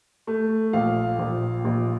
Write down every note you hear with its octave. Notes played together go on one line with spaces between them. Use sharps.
A3
A#1 F5
A#1
A#1